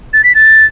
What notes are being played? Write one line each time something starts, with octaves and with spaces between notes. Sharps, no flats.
A6
B6
A6